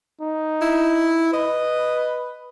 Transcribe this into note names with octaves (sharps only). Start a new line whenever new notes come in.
D#4
E4
B4 D#5